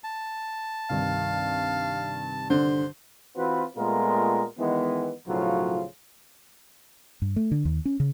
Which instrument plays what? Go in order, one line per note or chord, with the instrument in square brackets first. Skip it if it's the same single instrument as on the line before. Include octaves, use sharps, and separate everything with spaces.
[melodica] A5
[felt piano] C2 G2 D#3 [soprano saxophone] F5
[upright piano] D3 [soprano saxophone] C5
[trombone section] E3 C4 F4 F#4 B4
A#2 G#3 A3 B3 F4 A#4
D#3 E3 G#3 B3
B1 A2 C#3 F3 F#3 F4
[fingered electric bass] G2
A3
D3
D#2
C#4
C#3